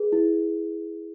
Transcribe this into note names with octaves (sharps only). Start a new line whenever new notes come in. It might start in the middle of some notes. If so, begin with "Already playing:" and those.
Already playing: G#4 B4
E4